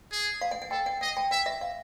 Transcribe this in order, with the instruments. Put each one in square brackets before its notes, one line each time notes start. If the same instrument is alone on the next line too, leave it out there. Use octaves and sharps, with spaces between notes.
[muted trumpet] G#4
[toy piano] F5
F#5
F#5
[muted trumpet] A4 [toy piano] G5
[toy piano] F#5
[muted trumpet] D#5 [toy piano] F#5
[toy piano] G5
[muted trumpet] E5 [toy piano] F#5
[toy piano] E5
F5